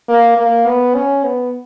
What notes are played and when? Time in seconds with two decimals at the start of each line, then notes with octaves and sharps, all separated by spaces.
0.09 A#3
0.37 A#3
0.67 B3
0.95 C#4
1.24 B3